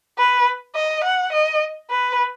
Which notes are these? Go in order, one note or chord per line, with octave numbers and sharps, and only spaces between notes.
B4
D#5
F#5
D#5
B4